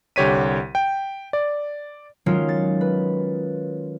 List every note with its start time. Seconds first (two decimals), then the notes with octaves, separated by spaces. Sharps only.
0.16 C2 D3 G4 C#5 B6 D#7
0.75 G5
1.33 D5
2.26 D#3 F#3 G#3 C#4 F4
2.49 A6
2.81 B4